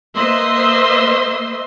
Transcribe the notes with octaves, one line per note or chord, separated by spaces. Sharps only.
A#3 B4 C5 D#5 E5 C6